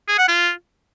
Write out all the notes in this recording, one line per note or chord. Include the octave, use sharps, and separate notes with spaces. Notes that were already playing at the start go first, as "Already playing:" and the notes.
G#4
F#5
F4